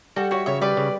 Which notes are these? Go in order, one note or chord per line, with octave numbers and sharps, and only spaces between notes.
G3 F#4 A4
F#4 C#5 E5
C#3 C#5 E5
G3 B4 D5
C#3